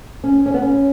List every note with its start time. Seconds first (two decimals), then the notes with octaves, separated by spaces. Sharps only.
0.24 C#4
0.46 C#4
0.54 B3
0.62 C#4